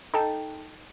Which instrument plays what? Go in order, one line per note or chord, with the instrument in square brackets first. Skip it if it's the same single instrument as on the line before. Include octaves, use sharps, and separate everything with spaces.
[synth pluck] D#4 A4 G5 A5